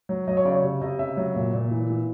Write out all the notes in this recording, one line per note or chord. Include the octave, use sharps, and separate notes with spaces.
F#3
F#3 D#5
C#5
C#3 D5
C#5
C3
C3 D#5
C#3 E5
F#3
A#2
A#2
E3
E3